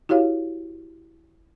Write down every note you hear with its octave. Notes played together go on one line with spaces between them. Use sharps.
E4 F#4 G4 C#5 F5